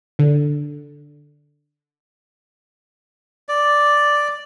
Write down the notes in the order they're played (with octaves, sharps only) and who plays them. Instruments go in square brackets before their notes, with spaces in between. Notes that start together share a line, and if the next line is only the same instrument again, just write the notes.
[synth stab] D3
[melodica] D5